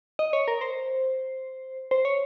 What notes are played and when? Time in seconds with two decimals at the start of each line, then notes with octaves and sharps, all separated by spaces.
0.19 D#5
0.33 C#5
0.48 A#4
0.61 C5
1.91 C5
2.05 C#5